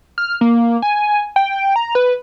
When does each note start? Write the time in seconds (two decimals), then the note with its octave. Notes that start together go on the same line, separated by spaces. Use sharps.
0.18 F6
0.41 A#3
0.82 G#5
1.36 G5
1.76 A#5
1.95 B4